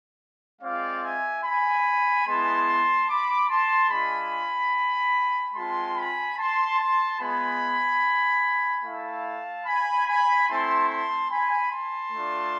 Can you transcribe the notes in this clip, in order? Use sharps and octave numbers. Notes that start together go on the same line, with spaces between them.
G#3 C4 F4 D5 F5
E5 G#5
G#5 B5
G#3 B3 E4 A5 C6
B5 D6
A5 C6
G#3 D4 F4 G#5 B5
G#3 C4 F4 A5 C6
G#5 B5
A5 C6
A5 C6
G#3 B3 F4 G#5 B5
A3 E4 F5 A5
G#5 B5
G#5 B5
A3 C4 E4 A5 C6
A5 C6
G#5 B5
A5 C6
A3 D4 F4